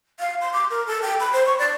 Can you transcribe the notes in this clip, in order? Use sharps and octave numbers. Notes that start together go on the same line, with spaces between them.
F5
C6
D6
A#4
A4
G5
B5
C5
C#6
D5